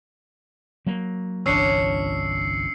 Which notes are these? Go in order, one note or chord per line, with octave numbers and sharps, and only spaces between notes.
F#3 A#3
G1 C2 E3 C#4 D4 E6 C7 C#7